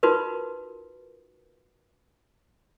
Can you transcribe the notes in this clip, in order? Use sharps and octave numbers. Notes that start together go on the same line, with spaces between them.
D#4 F4 F#4 A#4 B4